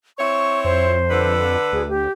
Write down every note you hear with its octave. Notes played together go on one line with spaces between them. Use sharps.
C4 E4 C#5 C#6
F2 C5
D3 B4
D2 G#4
G4